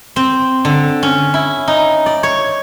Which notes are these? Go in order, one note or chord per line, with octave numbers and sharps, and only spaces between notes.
C4
D3
C#4
E4
D#4
D5
C#5